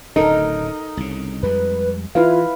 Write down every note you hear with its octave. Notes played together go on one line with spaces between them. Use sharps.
D1 D2 C#3 D#4 A4 A#4
C2 C#3
F2 G3 G#3 B4
E3 E4 F4 B4 F5